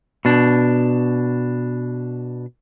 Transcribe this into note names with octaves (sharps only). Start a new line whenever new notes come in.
B2 D4